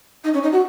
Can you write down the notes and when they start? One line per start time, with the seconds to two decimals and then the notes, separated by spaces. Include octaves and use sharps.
0.24 D#4
0.34 C#4
0.43 D#4
0.52 F#4